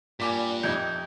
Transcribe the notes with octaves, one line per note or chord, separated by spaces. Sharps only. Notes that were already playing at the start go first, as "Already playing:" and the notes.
G2 A#2 G3 G#5 D6 B6
F2 C3 D#4 G6 G#6